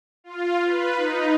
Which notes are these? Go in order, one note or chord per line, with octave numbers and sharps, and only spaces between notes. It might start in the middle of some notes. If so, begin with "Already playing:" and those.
F4
B4
D#4